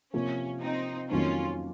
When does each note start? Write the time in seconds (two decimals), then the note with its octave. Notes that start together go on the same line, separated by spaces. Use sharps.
0.14 C3 F3 A#3 C#4
0.62 C4 D#4
1.11 F2 D#3 F#3 A#3 C#4 F4